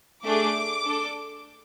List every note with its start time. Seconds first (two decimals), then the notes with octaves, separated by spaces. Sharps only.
0.24 A3 D4 G#4 D6
0.85 D4 A4